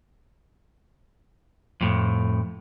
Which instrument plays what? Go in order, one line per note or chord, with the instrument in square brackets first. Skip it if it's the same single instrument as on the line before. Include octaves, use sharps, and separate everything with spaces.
[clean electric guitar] F2 A2